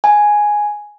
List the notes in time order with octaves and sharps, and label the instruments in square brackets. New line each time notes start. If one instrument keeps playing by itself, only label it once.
[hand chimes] G#5